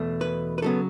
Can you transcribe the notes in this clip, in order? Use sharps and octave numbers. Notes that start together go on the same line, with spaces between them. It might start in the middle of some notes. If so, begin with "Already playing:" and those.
Already playing: E2 B2 A3
B4
B4
C#3 F#3 B3 A4